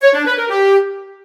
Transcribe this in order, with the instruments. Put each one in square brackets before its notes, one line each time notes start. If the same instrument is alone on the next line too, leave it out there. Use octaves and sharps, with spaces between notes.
[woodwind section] C#5
D4
B4
A#4
G4